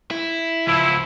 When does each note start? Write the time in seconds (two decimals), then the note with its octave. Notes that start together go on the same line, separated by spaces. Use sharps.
0.11 E4
0.67 C#2 F3 E4